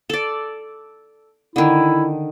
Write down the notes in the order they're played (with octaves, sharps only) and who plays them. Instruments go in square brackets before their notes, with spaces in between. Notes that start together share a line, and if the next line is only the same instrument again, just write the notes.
[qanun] A4 D5
[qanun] D3 D#3 [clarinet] E4